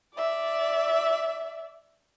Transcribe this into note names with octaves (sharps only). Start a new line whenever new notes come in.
D5 E5